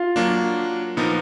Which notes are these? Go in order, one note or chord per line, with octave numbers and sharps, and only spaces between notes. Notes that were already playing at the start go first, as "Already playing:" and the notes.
Already playing: F4
F#3 A#3 D4
A#2 F3 B3 D#4 A#4